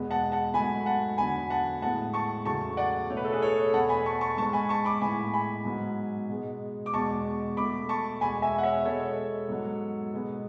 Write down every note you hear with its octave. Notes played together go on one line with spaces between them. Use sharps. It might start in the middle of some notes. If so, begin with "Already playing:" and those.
Already playing: E2 B2 G#3 B3
F#5 A5
F#5 A5
G#2 F#3 A3 G#5 B5
F#5 A5
E2 D3 F#3 B3 G#5 B5
F#5 A5
A2 G#3 B3 F#5 A5
A5 C#6
E2 C#3 F#3 A3 A5 C#6
D5 F#5
B2 A3 C#5
B4
A4
G#4 B4
A4 C#5
E2 B2 A3 F#5 A5
G#5 B5
A5 C#6
A5 C#6
G#2 G#3 B3 A5 C#6
G#5 B5
A5 C#6
B5 D6
A2 G#3 B3 G#5 B5
G#5 B5
G#2 F#3 B3
B2 G#3 B3
D6
E2 B2 G#3 A5 C#6
B2 A3 B5 D6
A5 C#6
E2 B2 G#3 G#5 B5
E5 G#5
F#5
C#5 E5
B2 G#3 B3 A4 C#5
G#2 F#3 B3
B2 G#3 B3